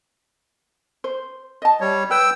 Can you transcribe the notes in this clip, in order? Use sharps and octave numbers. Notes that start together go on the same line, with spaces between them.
C5
D#5 A5
G3 C#5
B4 G5 E6